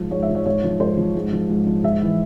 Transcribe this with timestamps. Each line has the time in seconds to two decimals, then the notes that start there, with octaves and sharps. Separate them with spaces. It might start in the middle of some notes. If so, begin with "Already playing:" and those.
Already playing: G#2 F3
0.11 G#2 C#5
0.22 E5
0.29 F3
0.35 C#5
0.46 G#2 C#5
0.64 F3
0.80 G#2 C5
0.97 F3
1.16 G#2
1.32 F3
1.49 G#2
1.67 F3
1.83 G#2 E5
2.02 E3